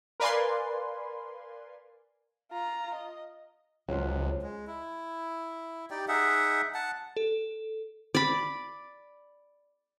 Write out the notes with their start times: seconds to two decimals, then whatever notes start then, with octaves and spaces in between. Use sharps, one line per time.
0.20 A#4 B4 D5 F5 G#5 C6
2.52 F4 A#5
2.95 D#5
3.88 C#2 F3 F#3
4.42 G#3
4.67 E4
5.91 D#4 G4 D5 G5
6.08 D#4 G#4 E5 F#5
6.74 F#5 A5
7.17 A4
8.15 D5 B5